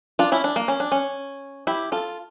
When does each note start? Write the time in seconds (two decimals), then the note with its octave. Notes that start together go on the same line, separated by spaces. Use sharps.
0.19 D4 F4
0.32 C#4 E4
0.44 D4
0.56 A#3
0.68 C#4
0.80 D4
0.92 C#4
1.67 E4 G4
1.92 F4 A4